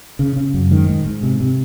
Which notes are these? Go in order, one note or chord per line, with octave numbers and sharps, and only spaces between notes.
C#3
C#3
F#2
G#2 D#3
G#2
G#2
C3
C3